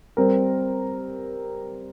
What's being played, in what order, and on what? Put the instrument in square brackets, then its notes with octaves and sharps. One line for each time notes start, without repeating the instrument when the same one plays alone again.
[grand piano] G3 C4 A#4